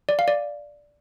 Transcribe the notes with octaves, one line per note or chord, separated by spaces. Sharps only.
D5
F5
D5